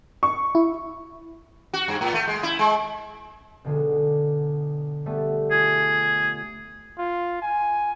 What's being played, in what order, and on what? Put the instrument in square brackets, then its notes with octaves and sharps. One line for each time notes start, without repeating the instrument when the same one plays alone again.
[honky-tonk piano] C#6
[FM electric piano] E4
[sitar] F#4
G2
A2
A3
G#3
E4
G#3
[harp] B1 D3 G#3
G3 A3 B3
[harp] F4 [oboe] G#4
[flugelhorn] F4
G#5